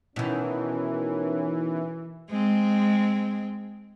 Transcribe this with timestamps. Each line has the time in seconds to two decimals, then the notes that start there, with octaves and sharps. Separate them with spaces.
0.16 B2 D#3 E3 C#4
2.30 G#3 C4